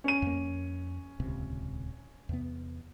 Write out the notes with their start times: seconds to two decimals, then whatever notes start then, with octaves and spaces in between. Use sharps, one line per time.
0.04 C#4 D#7
0.22 F2 A#3
1.20 D#1 C#2 C3
2.29 E2 C3 B3